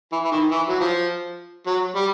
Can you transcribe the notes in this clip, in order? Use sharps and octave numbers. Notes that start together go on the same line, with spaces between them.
E3
E3
D#3
E3
F#3
F3
F#3
G3